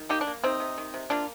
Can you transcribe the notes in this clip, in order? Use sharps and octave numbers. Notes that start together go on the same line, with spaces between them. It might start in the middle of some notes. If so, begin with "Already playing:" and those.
Already playing: D#3
A#3 D#4 G4
D4
A#3
C3 C4 D#4
C3
D#3
C3
A#3 D4 F4